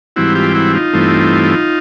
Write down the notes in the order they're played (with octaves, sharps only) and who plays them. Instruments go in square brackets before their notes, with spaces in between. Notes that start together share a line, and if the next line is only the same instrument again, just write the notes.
[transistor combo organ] G#2 E3 G3 C4 E4 F#4
F4 G4
E4 F#4
D#4 F4
G2 E3 A3 C4